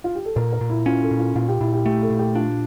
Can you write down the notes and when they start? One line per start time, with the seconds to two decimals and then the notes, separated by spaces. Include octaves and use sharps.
0.04 F4
0.15 G4
0.25 A4
0.36 A#2 A#4
0.53 A#4
0.61 A#2
0.70 E4
0.86 C#4 F4
1.03 A4
1.11 A#2
1.19 F4
1.36 A#2 F4
1.48 G4
1.61 A#2 E4
1.73 G4
1.85 A3 G4
2.02 A4
2.10 A#2
2.19 G4
2.35 D4 F4